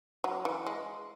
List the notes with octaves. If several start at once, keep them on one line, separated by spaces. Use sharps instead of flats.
F#3
E3
G#3